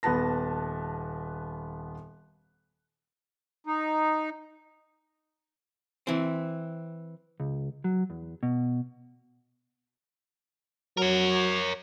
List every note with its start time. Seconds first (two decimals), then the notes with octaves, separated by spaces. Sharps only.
0.03 D#1 B3 B4 A5 A#6
3.66 D#4
6.07 E3 C4
7.40 C#2
7.84 F#3
8.10 E2
8.43 B2
10.98 F#3 A#4 C#5